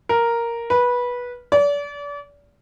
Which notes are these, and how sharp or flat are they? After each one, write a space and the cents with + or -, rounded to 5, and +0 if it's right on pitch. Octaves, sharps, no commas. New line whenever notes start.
A#4 +0
B4 -15
D5 -35